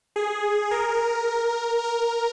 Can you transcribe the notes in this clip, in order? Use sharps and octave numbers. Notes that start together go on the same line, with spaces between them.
G#4
A#4
A#4